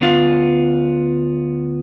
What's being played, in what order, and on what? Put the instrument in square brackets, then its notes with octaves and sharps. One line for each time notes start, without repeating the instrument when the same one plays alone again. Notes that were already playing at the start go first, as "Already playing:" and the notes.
[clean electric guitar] D2 B3 D4 F4 F5